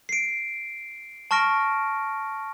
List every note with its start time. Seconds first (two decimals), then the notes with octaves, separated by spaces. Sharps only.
0.09 C7 D7
1.31 A5 C#6 F6 A#6 D7